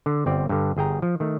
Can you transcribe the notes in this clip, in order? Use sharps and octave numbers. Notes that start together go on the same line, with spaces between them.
D3
G1 C4 D5
G2 D3
G1 G#4 G5 A#5
F3
D#3 A3